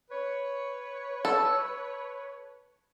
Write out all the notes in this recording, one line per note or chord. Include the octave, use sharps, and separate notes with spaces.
B4 C#5
A4